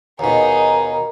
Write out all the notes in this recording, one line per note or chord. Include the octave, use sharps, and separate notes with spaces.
D#2 B2 D#4 G#4 A#4 A#5